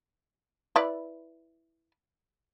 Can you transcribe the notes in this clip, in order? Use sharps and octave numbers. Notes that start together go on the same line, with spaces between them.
E4 B4 D5